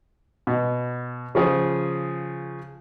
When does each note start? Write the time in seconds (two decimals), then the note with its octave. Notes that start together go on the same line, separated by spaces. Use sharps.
0.47 B2
1.35 C#3 F3 G#4